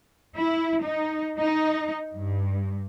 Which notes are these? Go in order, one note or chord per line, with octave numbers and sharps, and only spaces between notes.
E4
D#4
D#4
G2